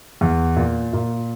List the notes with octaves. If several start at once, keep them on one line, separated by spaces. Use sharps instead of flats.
E2
A#2
A#2